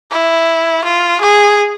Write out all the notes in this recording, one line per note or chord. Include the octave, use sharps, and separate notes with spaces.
E4
F4
G#4